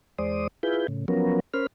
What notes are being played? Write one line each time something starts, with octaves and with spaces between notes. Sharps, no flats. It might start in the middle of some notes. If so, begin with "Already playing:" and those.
E2 G#3 C5 D5 D#6
E4 F4 G#4 B4 G6
A2 C#3
F3 F#3 B3 C#4 A#4
C#4 A#4 C5 B5 F6